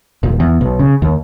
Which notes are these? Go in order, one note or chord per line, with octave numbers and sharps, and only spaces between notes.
D#1
E2
B1
C#3
D#2